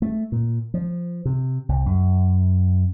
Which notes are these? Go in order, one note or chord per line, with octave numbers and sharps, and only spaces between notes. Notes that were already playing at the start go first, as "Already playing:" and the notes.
A3
A#2
F3
C3
C2
F#2